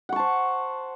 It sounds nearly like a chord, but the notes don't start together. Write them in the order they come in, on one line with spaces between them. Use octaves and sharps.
F#5 C#6 A5 C5